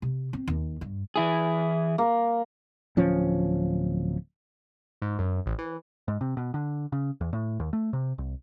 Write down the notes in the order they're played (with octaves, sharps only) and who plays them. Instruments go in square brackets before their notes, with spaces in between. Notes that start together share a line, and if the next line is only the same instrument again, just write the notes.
[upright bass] C3
C4
D#2
G2
[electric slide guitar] E3 E4 G#4
[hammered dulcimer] A#3
[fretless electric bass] D1 F3 C#4
[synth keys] G#2
F#2
A1
E3
[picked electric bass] G#2
C3
B2
D3
C#3
E2
A2
D#2
A3
C3
C2